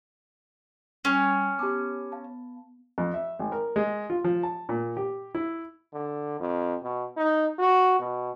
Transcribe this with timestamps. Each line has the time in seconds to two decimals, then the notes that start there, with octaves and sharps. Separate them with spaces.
1.05 G3 C#4 F6 C7 F7
1.59 B3 G4 A5 D6
2.12 F5 A5
2.98 F2
3.14 E5
3.39 G#1
3.52 A#4
3.76 G#3
4.10 F4
4.24 F3
4.43 A5
4.69 A#2
4.97 G4
5.35 E4
5.93 D3
6.40 F2
6.83 B2
7.17 D#4
7.59 F#4
7.99 B2